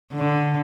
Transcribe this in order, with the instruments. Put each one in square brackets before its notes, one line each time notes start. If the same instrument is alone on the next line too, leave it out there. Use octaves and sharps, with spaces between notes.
[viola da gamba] D3